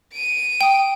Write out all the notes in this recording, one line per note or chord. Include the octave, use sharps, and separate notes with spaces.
D7 D#7
G5 D#6